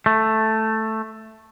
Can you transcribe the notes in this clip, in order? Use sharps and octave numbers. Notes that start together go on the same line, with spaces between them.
A3